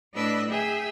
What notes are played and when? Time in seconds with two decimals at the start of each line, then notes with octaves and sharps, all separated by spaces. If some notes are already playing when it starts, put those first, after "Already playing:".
0.14 A2 D4 B4 D#5 E6 F#6
0.50 G#4 E5 G5 G#5 E6